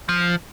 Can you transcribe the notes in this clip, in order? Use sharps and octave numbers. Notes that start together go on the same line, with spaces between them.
F3